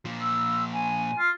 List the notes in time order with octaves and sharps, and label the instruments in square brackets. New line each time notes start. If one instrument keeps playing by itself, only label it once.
[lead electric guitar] A#2 F3
[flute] E6
G#5
[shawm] F4